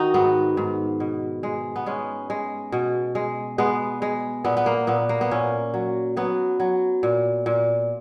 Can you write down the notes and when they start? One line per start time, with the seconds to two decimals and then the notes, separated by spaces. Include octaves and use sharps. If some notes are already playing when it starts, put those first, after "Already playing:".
Already playing: D#3 D#4 F#4
0.14 G#2 B3
0.57 G#2
1.00 B2
1.43 G#3
1.76 B3
1.86 G#3 C#4
2.30 G#3
2.72 B2
3.15 G#3
3.58 G#3 B3
4.02 G#3
4.44 A#2 B3
4.57 B3
4.66 A#3
4.87 A#2 B3
5.09 A#3
5.21 B3
5.31 A#2 C#4
5.74 F#3
6.17 F#3 B3
6.60 F#3
7.03 A#2
7.46 A#2